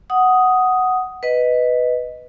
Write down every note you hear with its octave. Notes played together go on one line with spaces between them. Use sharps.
F#5 D#6
B4 D#5